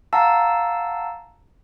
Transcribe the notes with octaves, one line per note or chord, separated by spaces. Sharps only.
F5 F#5 A5 A#5 E6